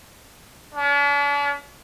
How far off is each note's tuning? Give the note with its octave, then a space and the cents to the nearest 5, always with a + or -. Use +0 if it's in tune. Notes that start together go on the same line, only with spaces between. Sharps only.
D4 -45